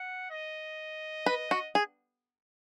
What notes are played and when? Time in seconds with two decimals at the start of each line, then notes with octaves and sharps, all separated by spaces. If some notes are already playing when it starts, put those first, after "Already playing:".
Already playing: F#5
0.31 D#5
1.26 B4
1.51 F#4
1.75 G#4